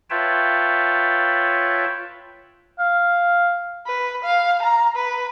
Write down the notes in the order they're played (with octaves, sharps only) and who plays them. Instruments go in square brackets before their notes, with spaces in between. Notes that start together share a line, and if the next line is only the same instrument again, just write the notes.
[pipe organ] F4 B4 C#5 E5 G5 A5
[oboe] F5
[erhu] B4
F5
A#5
B4